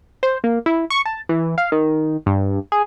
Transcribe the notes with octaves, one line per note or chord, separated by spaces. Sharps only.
C5
A#3
E4
C#6
A5
E3
F5
D#3
G2
G#4